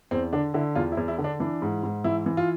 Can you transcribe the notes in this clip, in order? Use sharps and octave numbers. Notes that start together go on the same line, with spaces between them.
E2 C4
D3 D4
D3 E4
E2 F4
E4
E2
E4
D3
D4
E3 D4
G#2
G#2
E3 E4
E3
F4